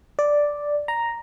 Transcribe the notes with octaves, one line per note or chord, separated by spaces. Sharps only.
D5
A#5